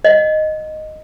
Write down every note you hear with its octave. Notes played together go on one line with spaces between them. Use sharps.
D#5 F#5